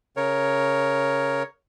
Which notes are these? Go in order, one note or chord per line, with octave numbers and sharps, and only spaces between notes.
C#3 A#4 C#5